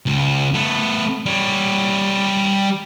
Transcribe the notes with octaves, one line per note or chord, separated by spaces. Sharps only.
C#2
A3 B3
G3 C#5